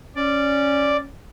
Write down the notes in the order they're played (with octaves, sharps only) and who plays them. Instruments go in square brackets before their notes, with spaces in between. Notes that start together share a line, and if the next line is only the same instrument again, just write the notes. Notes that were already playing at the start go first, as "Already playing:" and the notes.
[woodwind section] C#4 [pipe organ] D5